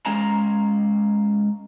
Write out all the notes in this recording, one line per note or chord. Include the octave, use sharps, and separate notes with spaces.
G#3 C#4 F5 G#5 A#5